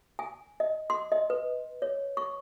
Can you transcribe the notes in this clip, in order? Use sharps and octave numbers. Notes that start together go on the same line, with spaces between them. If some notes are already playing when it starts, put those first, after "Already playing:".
G#5
D#5
C6
D#5
B4
C#5
C#6